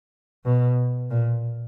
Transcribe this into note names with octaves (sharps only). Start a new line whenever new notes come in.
B2
A#2